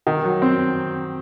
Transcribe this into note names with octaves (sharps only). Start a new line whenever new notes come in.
D#3
F#3
C4